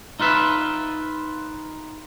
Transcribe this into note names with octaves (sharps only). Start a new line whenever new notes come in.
D#4 F4 B4 E5